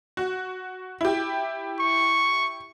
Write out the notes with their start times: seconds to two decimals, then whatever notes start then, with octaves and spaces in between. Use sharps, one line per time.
0.17 F#4
1.01 E4 G4
1.79 C#6